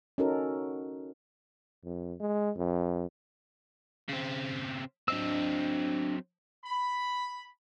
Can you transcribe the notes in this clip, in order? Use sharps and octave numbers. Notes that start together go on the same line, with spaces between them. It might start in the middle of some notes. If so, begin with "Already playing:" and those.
C#4 D#4 F#4 A4 A#4
F2
G#3
F2
C#3 C4
F#3 C4 D4 D#5 E6
B5